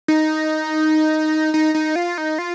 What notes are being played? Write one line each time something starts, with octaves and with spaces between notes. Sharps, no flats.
D#4
D#4
D#4
F4
D#4
F4